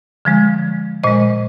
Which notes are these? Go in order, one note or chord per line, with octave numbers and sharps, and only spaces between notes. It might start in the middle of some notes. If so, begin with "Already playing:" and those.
D3 F3 G#3
A#2 G#3 C5 D#5